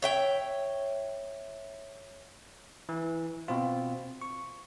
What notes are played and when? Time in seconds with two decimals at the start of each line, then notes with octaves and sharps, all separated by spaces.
0.02 C#5 E5 G5
2.89 E3
3.48 B2 C4 F4
4.22 C#6